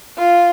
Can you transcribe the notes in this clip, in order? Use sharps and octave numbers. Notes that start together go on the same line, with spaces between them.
F4